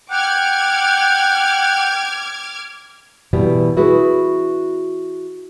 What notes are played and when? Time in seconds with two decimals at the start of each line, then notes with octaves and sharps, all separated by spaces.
0.11 F#5 G5 D6 F6 G#6
3.33 B2 E3 G3 B3
3.77 E4 F#4 G#4 B4